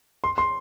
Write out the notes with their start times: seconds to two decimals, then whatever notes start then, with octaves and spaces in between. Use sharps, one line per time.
0.24 C6
0.38 C6